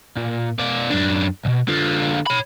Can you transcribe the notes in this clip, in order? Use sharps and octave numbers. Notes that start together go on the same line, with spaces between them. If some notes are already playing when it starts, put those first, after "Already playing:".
A#2
B2 D5
F#2 D4
B1 B2
D3 F4
C#5 B5